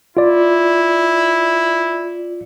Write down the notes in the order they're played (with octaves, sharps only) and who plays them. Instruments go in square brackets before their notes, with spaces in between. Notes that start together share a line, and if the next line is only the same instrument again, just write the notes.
[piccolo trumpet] E4 [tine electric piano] F4 D5